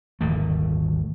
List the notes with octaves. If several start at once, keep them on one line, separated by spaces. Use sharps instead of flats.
D#1 G#1 D3 A3